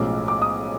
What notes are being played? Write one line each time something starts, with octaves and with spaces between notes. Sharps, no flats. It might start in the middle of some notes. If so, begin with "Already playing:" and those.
Already playing: B1 A2 F3 G#3 C#4 D6
D6
D#6